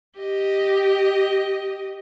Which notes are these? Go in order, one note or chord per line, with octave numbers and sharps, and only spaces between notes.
G4 D#5